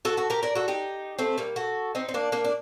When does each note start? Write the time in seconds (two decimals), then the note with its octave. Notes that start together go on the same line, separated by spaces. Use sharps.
0.05 F#4 A4
0.17 F#4 A4
0.30 G4 A#4
0.43 A#4 D5
0.55 F#4 A4
0.68 D#4 G4
1.19 A3 C4
1.38 G3 A#3
1.56 F#4 A4
1.95 C4 D#4
2.09 C4
2.14 A#3 D4
2.32 A#3 D4
2.44 D4